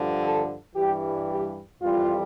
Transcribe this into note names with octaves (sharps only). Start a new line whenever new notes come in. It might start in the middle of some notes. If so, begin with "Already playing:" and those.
Already playing: G2 D3 F3
A4
G2 E3 G3 G4
G4
F2 E3 G3 F4